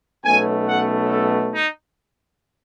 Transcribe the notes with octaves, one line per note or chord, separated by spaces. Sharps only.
B1 B2 A3 C#4 G#5
F#5
A4
D#4